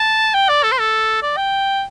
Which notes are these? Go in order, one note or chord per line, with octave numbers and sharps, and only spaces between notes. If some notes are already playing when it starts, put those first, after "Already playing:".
Already playing: A5
G5
D5
A4
C5
A4
D5
G5